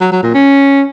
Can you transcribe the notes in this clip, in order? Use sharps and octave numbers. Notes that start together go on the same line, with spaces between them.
F#3
F#3
A#2
C#4